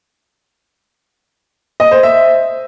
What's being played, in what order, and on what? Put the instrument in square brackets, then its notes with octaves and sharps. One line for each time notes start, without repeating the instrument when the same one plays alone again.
[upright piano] D#5
C5
E5